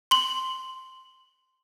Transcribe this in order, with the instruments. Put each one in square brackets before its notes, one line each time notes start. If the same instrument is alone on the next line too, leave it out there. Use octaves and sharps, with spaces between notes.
[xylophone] C6 F#7